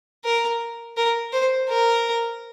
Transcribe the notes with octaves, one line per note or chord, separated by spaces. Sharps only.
A#4
A#4
C5
A#4